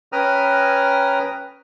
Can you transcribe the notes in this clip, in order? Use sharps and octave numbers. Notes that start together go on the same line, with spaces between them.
C#4 B4 G5 A#5 D#6 F6